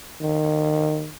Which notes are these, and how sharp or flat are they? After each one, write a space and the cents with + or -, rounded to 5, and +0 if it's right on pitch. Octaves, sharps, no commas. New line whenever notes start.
D#3 -25